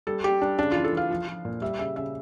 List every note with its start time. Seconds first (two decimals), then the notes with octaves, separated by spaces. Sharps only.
0.07 G3 A4
0.24 G3 G4
0.41 G3 D4
0.59 C#3 D4
0.72 E3 F4
0.84 A4
0.93 E3 F5
1.10 F3
1.28 F3
1.45 A#2
1.62 G3 E5
1.79 C#3 E5
1.96 C#3 E5